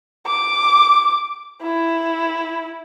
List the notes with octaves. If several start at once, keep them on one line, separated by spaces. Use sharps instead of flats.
D6
E4